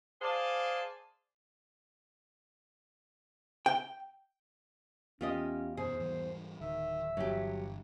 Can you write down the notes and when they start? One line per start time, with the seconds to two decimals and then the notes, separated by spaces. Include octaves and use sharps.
0.22 G#4 C5 D5 F5 G#5 A5
3.66 G5
5.21 E2 C#4 F4 G4 D#5
5.77 F#2 B2 G#4 C5
5.99 G#2 E3 G3
6.61 D1 D#3 E5
7.17 G1 G2 E3 F#3 G4